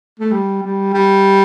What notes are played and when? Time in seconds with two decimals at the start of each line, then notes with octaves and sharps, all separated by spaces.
0.20 A3
0.31 G3
0.63 G3
0.94 G3